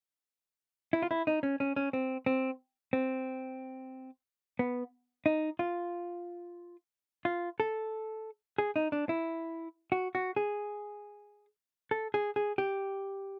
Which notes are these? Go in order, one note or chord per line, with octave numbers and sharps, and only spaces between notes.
E4
F4
E4
D#4
C#4
C#4
C#4
C4
C4
C4
B3
D#4
F4
F4
A4
G#4
D#4
D4
E4
F#4
F#4
G#4
A4
G#4
G#4
G4